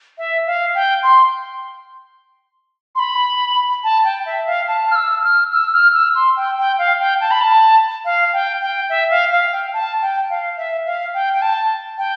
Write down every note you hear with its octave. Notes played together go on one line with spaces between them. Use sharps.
E5
F5
G5
C6
C6
B5
A5
G5
E5
F5
A5
F6
E6
F6
E6
F6
E6
C6
G5
G5
F5
G5
A5
B5
A5
F5
G5
G5
E5
F5
F5
G5
A5
G5
F5
E5
F5
G5
G5
A5
G5